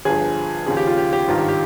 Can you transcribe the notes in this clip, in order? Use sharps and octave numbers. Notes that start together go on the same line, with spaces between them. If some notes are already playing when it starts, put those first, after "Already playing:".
G1 G2 F3 G#4
D#2 C#3 F3 G#4
G4
F4
G4
G4
G#1 G2 D#3 F4
G4
G4